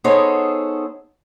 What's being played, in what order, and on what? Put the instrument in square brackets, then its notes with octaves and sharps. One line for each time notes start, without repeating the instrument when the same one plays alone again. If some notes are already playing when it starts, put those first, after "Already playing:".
[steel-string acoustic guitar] B3 D#4 G#4 A4 C5 C#5